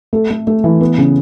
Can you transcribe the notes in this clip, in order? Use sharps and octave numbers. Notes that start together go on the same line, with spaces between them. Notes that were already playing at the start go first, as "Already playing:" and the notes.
A3 A4
A3
A3
E3
B3
C#3